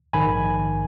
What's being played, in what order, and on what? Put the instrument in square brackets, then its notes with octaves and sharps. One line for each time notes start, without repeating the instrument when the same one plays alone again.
[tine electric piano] A#1 G#2 D#3 G#5 B5